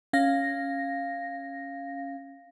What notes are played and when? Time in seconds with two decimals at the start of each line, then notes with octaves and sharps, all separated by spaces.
0.13 C#4 F5 A#6